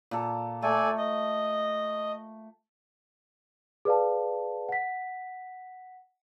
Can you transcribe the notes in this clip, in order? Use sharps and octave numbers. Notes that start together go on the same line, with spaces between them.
A#2 A4
A3 A4 D5 G#5
D#5
G#4 B4 D5 F5 A5
F#5 B6